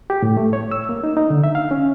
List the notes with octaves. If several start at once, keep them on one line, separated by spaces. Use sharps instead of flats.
G4
A2
A3
C#5
E6
A#3
D#4
D#4
D3
E5
F5
C#4